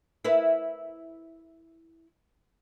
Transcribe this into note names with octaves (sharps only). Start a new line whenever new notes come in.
E4 A#4 B4